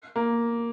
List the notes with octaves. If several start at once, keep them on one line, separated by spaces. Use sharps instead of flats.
A#3